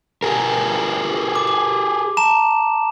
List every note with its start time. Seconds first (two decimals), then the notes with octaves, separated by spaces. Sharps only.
0.23 G4 G#4 A#4
1.35 D6
1.47 D6
2.17 A5 A#5 E7